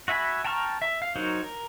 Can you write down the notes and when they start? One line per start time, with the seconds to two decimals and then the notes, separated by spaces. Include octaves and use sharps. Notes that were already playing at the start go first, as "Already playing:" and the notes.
0.08 F#4 E5 G#5 B5
0.45 G5 A5 A#5 C#6 F6
0.82 E5
1.02 F5
1.16 F#3 D#4 F#4 A#4 C5
1.44 A#4